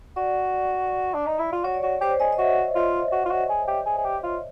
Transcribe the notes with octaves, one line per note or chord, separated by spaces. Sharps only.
F#4 D5
D4
D#4
E4
F4
F#4 C#5
D5
F#4 C#5
G4 C5
G#4 D#5
D#5
F#4 E5
F4
F#4
F4
F#4
G#4
G4
G#4
G#4
G4
F4